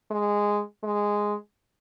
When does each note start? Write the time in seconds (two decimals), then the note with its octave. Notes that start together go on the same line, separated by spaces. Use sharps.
0.11 G#3
0.84 G#3